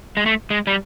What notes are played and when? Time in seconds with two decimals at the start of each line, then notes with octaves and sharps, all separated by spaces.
0.17 G#3
0.26 A3
0.50 G#3
0.67 G3